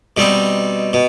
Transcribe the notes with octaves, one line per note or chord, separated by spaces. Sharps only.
B2 G3 C4 D#4
B2